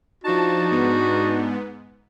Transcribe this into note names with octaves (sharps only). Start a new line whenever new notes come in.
F3 D4 D#4 F#4 A5
G#2 B3